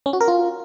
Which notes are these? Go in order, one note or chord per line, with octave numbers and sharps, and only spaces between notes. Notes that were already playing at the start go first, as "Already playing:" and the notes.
C#4
F#4
A#4
F4